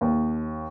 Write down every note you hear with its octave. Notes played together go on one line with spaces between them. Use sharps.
D#2